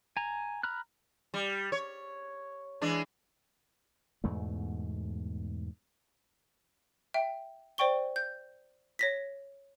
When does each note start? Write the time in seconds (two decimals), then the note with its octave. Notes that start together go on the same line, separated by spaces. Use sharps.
0.17 G#5 A#5
0.63 A#5 B5 F6 F#6
1.34 G3
1.72 C#5
2.82 E3 G#3 D4
4.24 E2 G#2 B2 A3
7.14 E5 G5
7.78 C5 D5 G5 C#6 G7
8.16 G6
8.99 C#5 A#6 B6